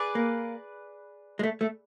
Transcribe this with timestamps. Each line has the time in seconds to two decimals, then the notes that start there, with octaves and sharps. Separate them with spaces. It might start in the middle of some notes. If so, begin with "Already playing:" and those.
Already playing: G#4 B4 D5
0.15 A#3
1.39 G#3
1.43 A3
1.61 A3